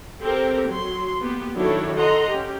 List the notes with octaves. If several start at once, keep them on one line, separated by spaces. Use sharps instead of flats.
C4 G4 A4 A#4
F#3 C6
A#3 B3 G4
D#3 F#3 D4 E4 A4 C#5
A4 D#5 F#5 A#5 C6
C#4 G4